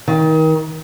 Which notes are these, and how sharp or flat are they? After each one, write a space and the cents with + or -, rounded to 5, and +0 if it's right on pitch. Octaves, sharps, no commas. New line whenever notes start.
D#3 +30